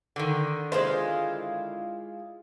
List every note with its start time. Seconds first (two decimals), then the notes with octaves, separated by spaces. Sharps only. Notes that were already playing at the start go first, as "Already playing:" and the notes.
0.16 D3 D#3
0.72 G#3 E4 F4 C5